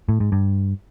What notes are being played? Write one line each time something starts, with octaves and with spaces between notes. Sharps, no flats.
A2
G#2
G2